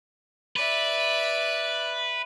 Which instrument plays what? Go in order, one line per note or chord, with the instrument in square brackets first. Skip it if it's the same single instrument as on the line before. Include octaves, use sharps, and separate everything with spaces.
[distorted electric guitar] B4 [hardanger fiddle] D5 E5